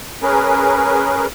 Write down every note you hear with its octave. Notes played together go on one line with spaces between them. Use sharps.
C#4 G#4 A#4 B4